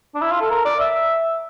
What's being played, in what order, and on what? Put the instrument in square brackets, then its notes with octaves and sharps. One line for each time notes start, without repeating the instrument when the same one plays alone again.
[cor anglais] D4
E4
F4
A4
A#4
D5
E5